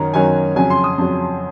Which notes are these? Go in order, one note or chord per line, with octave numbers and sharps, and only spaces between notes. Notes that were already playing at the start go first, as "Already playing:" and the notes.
Already playing: F#2 D#3 F#3 C#4 A#5
F#2 D#3 F#3 C#4 G#5
F2 C#3 F#3 C#4 G#5
C6
D#6
F2 C#3 F#3 C#4